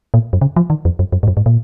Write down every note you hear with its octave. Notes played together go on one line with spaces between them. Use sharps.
A#2
F#2
C#3
F3
D#3
F2
F#2
F#2
G#2
F#2
G#2
A#2